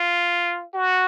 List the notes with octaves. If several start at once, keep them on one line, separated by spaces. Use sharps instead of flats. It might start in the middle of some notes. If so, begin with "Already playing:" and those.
Already playing: F4
F#4